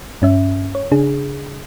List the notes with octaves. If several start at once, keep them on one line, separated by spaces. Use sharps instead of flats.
G2 C#4 E5
C#5
C#3 D4 G#4